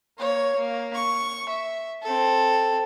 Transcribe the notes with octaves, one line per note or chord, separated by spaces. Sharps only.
A#3 C#5
A#3
C#6
E5
C4 A4